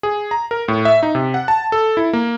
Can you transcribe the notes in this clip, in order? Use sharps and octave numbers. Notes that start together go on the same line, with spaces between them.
G#4
A#5
A#4
A2
E5
D#4
C3
F#5
A5
A4
E4
A#3